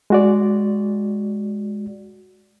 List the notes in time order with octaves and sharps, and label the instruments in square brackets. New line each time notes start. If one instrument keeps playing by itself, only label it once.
[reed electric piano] G#3 F#4 D5